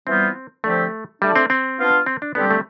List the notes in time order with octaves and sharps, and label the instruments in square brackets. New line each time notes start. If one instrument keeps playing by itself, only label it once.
[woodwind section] E3 G3 B3 F4 C5 [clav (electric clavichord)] C4
[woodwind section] D3 F3 C4 G4 [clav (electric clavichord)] A3
[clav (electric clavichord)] G3 [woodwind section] A3 D4 A4 D5
[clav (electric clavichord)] C4
C4
[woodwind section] B3 D4 F4
[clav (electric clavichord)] C4
D4
[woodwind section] D3 G3 C4 G4 [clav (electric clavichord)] B3
[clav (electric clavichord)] A3